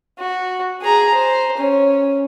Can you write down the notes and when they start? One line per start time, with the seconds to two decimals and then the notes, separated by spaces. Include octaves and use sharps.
0.19 F#4
0.81 G#4 A#5
1.14 C5
1.57 C#4